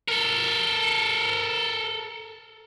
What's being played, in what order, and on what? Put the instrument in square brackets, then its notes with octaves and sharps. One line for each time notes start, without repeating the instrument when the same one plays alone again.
[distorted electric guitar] A4 A#4